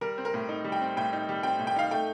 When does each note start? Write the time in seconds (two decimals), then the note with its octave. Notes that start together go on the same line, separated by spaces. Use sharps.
0.01 G3 A#4
0.18 C4
0.25 A#4
0.34 A2
0.49 D#4
0.64 G3
0.72 G5
0.81 C4
0.97 A2 G5
1.13 D#4
1.29 G3
1.43 C4 G5
1.59 A2
1.67 G5
1.76 D#4 F5
1.91 A3 G5